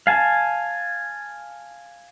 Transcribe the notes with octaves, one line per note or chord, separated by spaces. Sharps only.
F5 G#5 A5